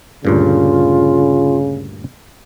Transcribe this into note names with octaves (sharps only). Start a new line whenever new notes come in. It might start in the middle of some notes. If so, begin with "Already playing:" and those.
D2 G2 A#2 C#3 F4